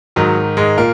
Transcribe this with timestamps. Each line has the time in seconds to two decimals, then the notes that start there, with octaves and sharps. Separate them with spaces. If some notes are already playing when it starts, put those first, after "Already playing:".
0.16 G#2 D#3 F#3
0.57 G#2 G#3
0.78 A#2 A#3